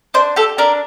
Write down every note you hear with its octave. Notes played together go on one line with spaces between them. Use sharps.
D4 C5
G4 A4
D4 A#4